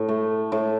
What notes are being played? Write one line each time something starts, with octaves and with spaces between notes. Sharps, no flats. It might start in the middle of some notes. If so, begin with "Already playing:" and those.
Already playing: A2
A3
A2